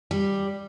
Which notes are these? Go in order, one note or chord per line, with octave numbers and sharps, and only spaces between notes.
G3